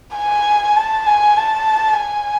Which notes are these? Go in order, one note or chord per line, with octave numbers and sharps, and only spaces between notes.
G#5
A5
G#5
A5
G#5